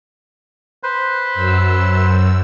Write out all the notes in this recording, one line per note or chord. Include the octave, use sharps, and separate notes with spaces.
B4 C5
F#2 E6